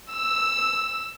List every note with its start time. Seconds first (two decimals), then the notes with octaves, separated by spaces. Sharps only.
0.12 E6